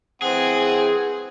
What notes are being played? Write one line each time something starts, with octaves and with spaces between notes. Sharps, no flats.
E3 C4 G#4 F#5